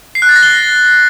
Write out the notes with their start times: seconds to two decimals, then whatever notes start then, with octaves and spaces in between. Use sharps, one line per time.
0.15 C7
0.22 F#6
0.29 A6
0.36 A#6
0.43 G7